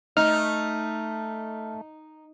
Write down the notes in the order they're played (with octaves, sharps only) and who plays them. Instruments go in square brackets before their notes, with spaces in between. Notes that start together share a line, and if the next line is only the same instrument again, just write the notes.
[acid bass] A3 [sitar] D#4 [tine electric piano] F6